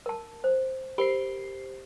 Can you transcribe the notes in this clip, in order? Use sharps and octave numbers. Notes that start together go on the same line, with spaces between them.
A#4 A5
C5
G4 A#4 C5 B5 C7